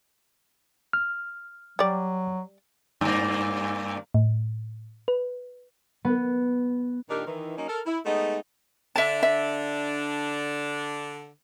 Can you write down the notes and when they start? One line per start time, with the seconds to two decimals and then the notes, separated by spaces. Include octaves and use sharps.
0.93 F6
1.79 F#3 G3 D5
3.01 G2 A#3
4.14 A2
5.08 B4
6.05 B3
7.10 A#2 D#3 D4 D#4 G4 A#4
7.27 D#3 E3
7.56 F#3 A#3 C#4 D#4
7.68 A4 A#4
7.86 E4
8.06 G#3 A3 B3 D#4
8.96 D3 D4 E5 A5
9.23 E5